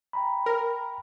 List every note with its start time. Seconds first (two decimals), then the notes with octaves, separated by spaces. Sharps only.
0.13 G5 A#5 B5
0.46 A#4